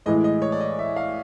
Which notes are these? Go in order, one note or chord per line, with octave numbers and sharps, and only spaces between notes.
A2 E3 G#3 D#5
D#5
C#5
D5
D#5
E5
F5